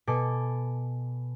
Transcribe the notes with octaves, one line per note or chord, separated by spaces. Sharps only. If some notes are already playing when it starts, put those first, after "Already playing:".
B2 A4 G#5 D6